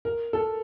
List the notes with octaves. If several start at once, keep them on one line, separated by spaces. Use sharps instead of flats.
A#4
A4